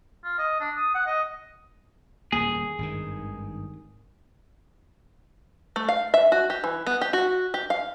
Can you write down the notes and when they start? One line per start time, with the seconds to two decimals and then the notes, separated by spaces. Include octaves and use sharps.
0.24 F4
0.39 D#5
0.61 D4
0.77 D#6
0.95 F#5
1.07 D#5
2.32 D#1 F2 A#3 G#4
2.78 G#1 G2 D#3
5.76 A3
5.89 F5
6.14 E5
6.32 F#4
6.50 G4
6.64 E3
6.87 B3
7.01 G4
7.13 F#4
7.54 G4
7.70 F5